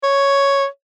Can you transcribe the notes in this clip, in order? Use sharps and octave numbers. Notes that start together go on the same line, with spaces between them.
C#5